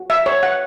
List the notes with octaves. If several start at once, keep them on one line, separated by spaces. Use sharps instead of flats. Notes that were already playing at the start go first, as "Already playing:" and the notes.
Already playing: F#4
E5
C#5
F#5